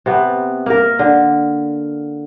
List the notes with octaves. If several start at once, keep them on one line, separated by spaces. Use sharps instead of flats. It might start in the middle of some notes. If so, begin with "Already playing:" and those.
C3 B3
A#3 A#4
D3